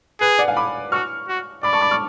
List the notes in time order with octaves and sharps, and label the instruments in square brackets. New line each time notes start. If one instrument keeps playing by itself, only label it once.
[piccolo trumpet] G#4 [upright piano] B4
[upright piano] D5 F#5
F5 G#5
B5 D6
[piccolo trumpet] F#4 [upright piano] C#6 F6
[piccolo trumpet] F#4
[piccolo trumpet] D5 [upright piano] B5 D6
[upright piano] A5 C#6
B5 D6
C#6 F6